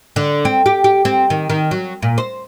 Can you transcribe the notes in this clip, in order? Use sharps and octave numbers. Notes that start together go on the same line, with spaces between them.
D3
C4
G4
G4
C4
D#3
D#3
F#3
A#2
C5